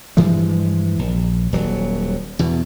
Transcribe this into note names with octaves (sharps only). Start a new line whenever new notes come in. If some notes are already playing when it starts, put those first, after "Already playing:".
G2 E3 F3 G#3
A#1
D#1 F#3
E2 B2